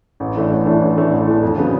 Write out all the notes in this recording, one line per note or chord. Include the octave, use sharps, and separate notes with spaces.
A1
A2 E3 A3 D4
A1
A2 E3 A3 D4
A1
A2 E3 A3 D4
A1
A2 E3 A3 D4
F2
C#3 F#3 B3 D4